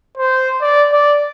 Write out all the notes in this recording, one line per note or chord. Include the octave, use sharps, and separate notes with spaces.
C5
D5
D5